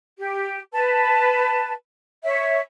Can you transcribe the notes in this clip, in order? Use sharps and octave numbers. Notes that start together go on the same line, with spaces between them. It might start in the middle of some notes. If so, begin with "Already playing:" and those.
G4
B4 A5
C#5 E5